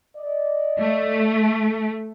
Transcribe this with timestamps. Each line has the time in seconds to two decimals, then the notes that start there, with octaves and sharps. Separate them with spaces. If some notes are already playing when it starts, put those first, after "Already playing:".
0.17 D5 D#5
0.79 A3